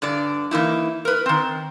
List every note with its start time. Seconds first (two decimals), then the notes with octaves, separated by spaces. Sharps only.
0.02 G2 D3 D5
0.51 E3 A#3 D#4 E4
1.05 A#4 B4
1.26 D#3 C4